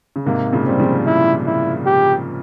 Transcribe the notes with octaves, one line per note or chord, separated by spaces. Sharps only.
C#3
G#2 C3 A#3
A#2 C#3
G3 C4
C#3 F3
E4
E4
G4